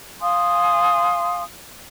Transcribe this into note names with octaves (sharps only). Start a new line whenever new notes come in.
F5 G#5 C6 D#6